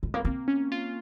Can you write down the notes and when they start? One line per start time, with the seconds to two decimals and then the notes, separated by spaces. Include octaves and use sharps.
0.03 G#3
0.14 A#3
0.25 A#3 C4
0.48 C#4
0.72 F4